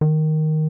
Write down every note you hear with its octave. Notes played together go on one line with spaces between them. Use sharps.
D#3